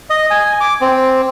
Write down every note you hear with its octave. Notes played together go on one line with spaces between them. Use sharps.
D#5
G#5
D6
C4